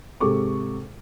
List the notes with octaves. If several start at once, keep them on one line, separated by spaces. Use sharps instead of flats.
G#2 C3 G#4 A4 C#6 D6